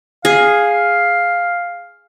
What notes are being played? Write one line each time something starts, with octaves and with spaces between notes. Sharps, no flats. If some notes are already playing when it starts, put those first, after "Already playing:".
G#4 F5